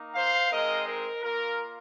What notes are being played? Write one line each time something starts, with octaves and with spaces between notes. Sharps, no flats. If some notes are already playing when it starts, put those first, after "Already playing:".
Already playing: A#3 D#4
C5 F5
G#3 C4 D#4 A#4 D#5
A#4
A#3 F4 A#4